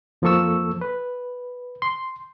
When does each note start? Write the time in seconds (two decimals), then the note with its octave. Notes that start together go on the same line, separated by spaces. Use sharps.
0.22 F2 F3 A#3 A4 C#6 E6
0.81 B4
1.82 C6